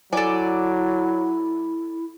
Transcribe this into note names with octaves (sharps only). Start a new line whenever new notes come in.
F#3 E4 A4 D5 G#5